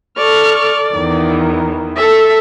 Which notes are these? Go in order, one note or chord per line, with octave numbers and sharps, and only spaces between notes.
A4 D5 C#6 F6
E2 D#3 E3
A4 E5